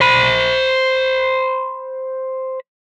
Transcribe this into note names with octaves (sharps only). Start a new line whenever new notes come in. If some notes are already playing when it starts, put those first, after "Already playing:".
C5 B5